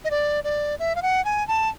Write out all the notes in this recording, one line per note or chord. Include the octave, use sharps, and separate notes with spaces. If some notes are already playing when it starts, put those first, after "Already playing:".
D#5
D5
D5
E5
F5
F#5
G#5
A5